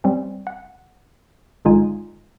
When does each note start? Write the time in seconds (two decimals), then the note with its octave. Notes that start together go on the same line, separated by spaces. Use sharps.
0.04 G3 C4 C#4
0.47 F#5
1.65 G#1 D3 G#3 D#4 F4 G#5